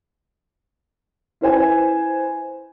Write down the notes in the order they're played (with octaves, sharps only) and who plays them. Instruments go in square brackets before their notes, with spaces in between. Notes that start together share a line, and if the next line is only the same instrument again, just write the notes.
[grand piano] E4 B4 C5 G#5